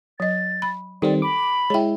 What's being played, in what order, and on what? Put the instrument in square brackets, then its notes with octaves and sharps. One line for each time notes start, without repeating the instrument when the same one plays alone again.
[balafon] F#3 D#5 [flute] A6
[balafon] B5
[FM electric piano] D#3 G3 C4 [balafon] A4 G5 [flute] D5
[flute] B5 [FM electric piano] D6
[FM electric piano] G#3 E4 [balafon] C#5 G5